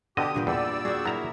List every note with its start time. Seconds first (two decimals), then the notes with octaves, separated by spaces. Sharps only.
0.17 B2 D3 G4 D#5 D#6
0.34 G2 A#2 B3 G5
0.47 E2 G3 D5 E6
0.85 F#4 G#4 G5
1.05 F#3 E4 A#4 A#5